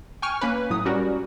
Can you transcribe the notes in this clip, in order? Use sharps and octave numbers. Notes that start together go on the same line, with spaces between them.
G5 G#5 C#6 F6
A#3 C#4 B4
A2 F#3 D#6
G3 C#4 F#4 A#4